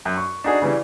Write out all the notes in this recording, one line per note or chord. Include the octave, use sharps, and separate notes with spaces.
F#2
C#6
D4 D#4 F#4 G#4
C#3 E3 G3